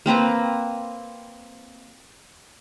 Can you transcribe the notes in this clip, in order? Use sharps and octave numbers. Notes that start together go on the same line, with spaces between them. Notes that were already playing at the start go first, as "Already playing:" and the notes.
A#3 C4 B4 A#5